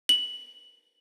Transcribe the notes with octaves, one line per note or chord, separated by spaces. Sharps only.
F#7